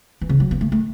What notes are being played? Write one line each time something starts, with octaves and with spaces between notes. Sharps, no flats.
E3
C#3
F#3
B3
A3
A3